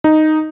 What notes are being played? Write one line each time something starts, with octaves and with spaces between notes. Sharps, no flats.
D#4